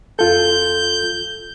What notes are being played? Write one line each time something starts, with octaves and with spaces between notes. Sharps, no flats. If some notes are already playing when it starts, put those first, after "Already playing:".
F2 F4 A4 G6